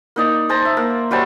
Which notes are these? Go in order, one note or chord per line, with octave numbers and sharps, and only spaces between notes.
A#3 D#4 D5
C5 A5 A#5
E5
A#3
F#3 G3 C5 A5